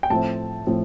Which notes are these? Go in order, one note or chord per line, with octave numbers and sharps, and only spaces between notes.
G5
A2 F3 A3 C4 A5
A2 F3 A3 C4